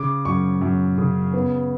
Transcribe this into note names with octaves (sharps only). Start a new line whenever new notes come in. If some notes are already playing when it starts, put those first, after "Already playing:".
Already playing: C#3 D6
F#2 C#6
F#2
C#3
B3